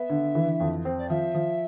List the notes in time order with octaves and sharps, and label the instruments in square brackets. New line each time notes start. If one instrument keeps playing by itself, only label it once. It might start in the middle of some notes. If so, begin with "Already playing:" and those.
Already playing: [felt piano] B3 [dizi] E5
[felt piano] D3
E3
F2
C4
[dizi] D5
[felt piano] F3 [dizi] E5
[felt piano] F3